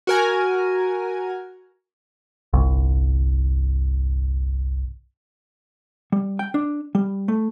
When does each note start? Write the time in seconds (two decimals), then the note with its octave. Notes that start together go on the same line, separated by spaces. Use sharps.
0.07 F#4 A#4 G#5
2.53 G1 C2
6.12 G3
6.39 G5
6.54 D4
6.95 G3
7.28 A3